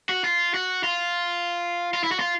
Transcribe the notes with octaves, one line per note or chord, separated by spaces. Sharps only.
F#4
F4
F#4
F4
F4
E4
F#4
F4